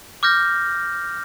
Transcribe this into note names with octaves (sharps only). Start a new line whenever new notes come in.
D6 F6 G6 A#6